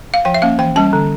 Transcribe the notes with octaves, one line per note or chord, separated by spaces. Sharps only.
F5
F3 G5
E5
A#3 C#4 F5
E3 G5
G3 C#4 A5
D3